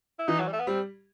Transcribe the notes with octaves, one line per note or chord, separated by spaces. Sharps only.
E4
E3 D#4
F#3
G3
A3
B3
G3 C4